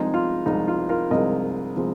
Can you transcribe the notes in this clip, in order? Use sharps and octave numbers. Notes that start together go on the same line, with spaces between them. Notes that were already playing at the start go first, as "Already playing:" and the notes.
Already playing: C2 C3 F3 G#3 D#4 G#4
F4
C2 C3 F3 G#3 D#4
F4
F4 A#4
C2 C3 F3 G#3 A#4 D#5
C3 F3 G#3